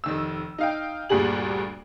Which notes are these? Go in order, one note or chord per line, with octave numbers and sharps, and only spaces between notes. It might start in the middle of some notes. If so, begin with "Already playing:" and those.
F1 D#3 E6
D#4 F5 G5
D2 G2 A#2 G3 G#4 F#7